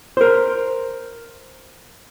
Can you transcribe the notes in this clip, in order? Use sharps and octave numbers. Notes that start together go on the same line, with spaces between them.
A#4 C5